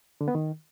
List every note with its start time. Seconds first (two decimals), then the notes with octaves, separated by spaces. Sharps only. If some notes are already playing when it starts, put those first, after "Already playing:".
0.21 D3
0.28 B3
0.35 D#3